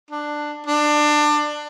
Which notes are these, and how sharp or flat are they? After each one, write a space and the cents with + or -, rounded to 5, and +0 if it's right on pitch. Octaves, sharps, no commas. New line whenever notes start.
D4 +10
D4 +20